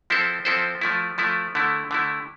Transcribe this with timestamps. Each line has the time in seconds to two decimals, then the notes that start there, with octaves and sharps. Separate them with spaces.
0.10 F3 C4 E4 A4 C5
0.45 F3 C4 E4 A4 C5
0.81 F3 A3 E4
1.18 F3 A3 E4
1.55 D3 A3 E4
1.91 D3 A3 E4